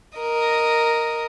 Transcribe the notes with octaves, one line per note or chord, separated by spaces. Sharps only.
A#4 D#5